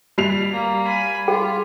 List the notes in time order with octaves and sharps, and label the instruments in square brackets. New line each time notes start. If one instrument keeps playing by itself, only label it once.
[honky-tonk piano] G3 C7 F7
[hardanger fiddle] A#3
G#5 B5
[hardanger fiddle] F4 [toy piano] G#4 G5